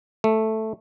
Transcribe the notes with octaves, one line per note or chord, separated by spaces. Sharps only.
A3